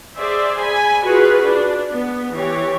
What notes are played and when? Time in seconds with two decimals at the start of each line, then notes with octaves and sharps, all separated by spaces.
0.17 G#4 C5 D5 E5
0.59 G#5 B5
1.05 F4 F#4 G#4 B4
1.45 D4
1.90 B3
2.33 E3 G4 C#5